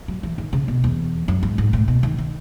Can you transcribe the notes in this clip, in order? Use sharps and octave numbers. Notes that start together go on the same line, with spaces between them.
F#3
E3
D#3
C#3
B2
E2
F#2
G#2
G#2
A2
B2
D#3
D#3